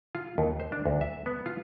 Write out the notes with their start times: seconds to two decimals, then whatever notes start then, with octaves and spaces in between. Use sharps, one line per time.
0.15 F4
0.38 D#2
0.60 C5
0.72 D4
0.86 D2
1.01 E5
1.26 B3
1.46 F4